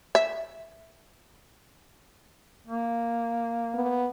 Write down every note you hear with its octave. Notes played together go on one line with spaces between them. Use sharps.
E5
A#3
B3